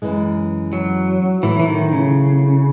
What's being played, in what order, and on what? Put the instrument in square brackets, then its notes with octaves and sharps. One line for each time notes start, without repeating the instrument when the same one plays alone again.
[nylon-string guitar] F#2 E3 G#3
[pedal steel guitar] F#3
[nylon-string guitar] A2 F#3 B3 E4 [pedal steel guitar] E3
[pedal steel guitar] E3
D#3
C#3